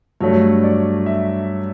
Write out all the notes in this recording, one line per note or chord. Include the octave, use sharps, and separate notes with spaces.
G2 F#3 A3 C#5
D5
E5